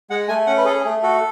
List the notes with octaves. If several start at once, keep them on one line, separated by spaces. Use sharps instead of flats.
G#3 F#5
A3 G#5
C#4 F#5
B4
G#4 A4
A3 G#4
F#4 A4